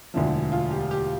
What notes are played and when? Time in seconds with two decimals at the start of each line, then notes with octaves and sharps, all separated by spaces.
0.14 E1 D2 D3 F3 E4
0.34 E4
0.52 F4
0.71 G4
0.91 G4